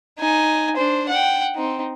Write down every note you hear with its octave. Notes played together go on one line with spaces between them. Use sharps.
D#4 G#5
D4 C5
F#5 G5
C4 D#4